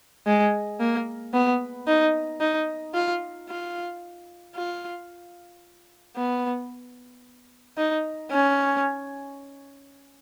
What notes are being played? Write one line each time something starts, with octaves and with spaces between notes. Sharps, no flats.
G#3
A#3
B3
D#4
D#4
F4
F4
F4
B3
D#4
C#4